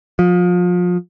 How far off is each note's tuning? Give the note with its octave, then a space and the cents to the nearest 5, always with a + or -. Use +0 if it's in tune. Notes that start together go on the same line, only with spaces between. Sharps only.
F3 +30